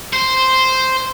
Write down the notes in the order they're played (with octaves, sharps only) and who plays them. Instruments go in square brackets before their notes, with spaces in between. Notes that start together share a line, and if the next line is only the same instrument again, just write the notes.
[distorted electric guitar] C5